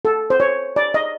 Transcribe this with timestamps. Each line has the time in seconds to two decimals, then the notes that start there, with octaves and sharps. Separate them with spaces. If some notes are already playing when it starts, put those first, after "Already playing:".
0.05 A4
0.30 C5
0.40 C#5
0.76 D5
0.94 D#5